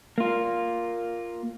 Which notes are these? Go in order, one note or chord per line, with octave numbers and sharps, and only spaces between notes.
A#3 F4